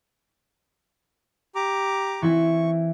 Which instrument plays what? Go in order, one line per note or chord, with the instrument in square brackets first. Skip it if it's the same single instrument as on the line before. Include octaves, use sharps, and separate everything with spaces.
[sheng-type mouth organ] G4 A#5 D6
[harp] E3 C4 E4 [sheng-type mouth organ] C#6